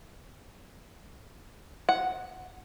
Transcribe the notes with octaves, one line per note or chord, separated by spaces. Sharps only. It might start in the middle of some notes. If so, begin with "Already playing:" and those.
F#5